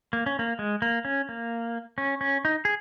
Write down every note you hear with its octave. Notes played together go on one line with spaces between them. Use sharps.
A#3
C#4
A#3
G#3
A#3
C#4
A#3
C#4
C#4
D#4
G#4